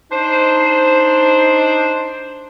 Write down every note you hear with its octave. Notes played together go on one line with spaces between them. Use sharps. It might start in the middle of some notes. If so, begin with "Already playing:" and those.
D4 D#4 C5